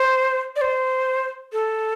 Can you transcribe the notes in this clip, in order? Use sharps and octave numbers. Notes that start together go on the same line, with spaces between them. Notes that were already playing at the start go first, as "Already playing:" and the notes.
Already playing: C5
D5
C5
A4